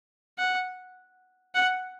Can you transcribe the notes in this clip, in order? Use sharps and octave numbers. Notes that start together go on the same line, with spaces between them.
F#5
F#5